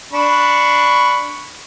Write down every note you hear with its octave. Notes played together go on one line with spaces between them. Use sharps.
D4 B5 C#6